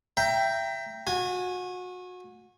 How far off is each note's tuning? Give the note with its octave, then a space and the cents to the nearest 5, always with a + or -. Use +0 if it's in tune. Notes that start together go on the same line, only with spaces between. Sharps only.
E5 +25 G5 +0 A#5 +0
F#4 -30 G#5 +0